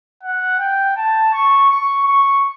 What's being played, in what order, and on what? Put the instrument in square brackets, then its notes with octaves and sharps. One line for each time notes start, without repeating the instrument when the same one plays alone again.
[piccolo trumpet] F#5
G5
A5
C#6
C#6
C#6